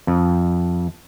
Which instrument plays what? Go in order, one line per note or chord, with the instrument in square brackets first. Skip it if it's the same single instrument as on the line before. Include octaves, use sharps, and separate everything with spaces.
[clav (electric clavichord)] F2